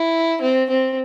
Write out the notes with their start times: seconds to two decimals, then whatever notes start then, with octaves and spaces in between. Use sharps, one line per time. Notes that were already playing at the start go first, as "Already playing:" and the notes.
Already playing: E4
0.41 C4
0.69 C4